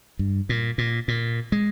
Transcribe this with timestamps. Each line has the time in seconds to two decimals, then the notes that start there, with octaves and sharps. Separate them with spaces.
0.19 G2
0.49 A#2
0.78 A#2
1.08 A#2
1.52 G#3